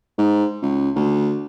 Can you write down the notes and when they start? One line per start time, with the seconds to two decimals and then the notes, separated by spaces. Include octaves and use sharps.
0.18 G#2
0.62 C#2
0.96 D2